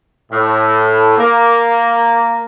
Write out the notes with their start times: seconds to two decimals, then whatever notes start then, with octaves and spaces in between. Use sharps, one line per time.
0.31 A2
1.18 A#3